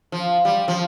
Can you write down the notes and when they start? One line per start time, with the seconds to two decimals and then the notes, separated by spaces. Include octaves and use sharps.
0.12 F3
0.45 G3
0.68 F3